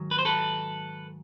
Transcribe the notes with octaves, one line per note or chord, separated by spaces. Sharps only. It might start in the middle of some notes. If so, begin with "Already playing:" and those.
Already playing: G#2 D#3 F#3
B4
C5
A4 B4